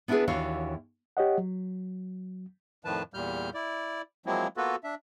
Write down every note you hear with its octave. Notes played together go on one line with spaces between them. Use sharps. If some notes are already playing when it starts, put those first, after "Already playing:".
B3 D4 E4 G4 G#4 B4
D#2 E3 D4 F#4 C#5 F5
G4 C#5 D#5 F#5
F#3
F2 A2 D#3 F3 B4 A5
E2 A#2 G3 F6 G6
E4 D5
F3 F#3 G#3 A#3 C4 E4
A#3 B3 F4 F#4 A4 B4
D4 E5